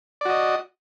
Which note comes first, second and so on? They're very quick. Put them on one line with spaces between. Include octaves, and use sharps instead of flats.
D5 F#4 D#5